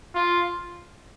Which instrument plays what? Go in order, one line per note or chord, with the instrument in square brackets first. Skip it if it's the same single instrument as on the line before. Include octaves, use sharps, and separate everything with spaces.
[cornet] F4